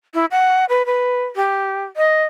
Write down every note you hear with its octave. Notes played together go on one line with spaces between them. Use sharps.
E4
F#5
B4
B4
G4
D#5